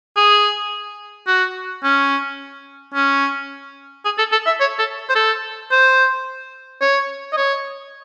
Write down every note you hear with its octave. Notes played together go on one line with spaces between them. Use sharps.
G#4
F#4
C#4
C#4
G#4
A4
A4
E5
C#5
A4
C5
A4
C5
C#5
D#5
C#5